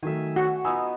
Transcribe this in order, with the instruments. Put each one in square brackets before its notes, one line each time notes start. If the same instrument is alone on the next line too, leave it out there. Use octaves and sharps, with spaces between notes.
[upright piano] D#3 F#3 A3 [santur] E5 F5 G#5
[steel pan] F#4 [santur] F#5
[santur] B3 D#4 F4 [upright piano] G#5 B5 E6